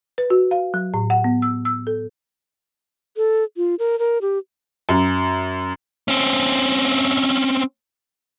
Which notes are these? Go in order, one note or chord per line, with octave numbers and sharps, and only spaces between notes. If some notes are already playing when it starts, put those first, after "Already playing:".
B4
F#4
F5
F#3
A2
F#5
B3
E6
E6
A4
A4
F4
A#4
A#4
G4
F#2
C4 C#4